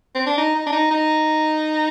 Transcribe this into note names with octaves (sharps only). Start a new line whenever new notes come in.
C4
D4
D#4
D#4
D4
D#4
D#4